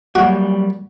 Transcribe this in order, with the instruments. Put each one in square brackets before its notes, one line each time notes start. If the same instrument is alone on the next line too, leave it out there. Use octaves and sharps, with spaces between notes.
[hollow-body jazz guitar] F#3 G3 A#3 [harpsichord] F#4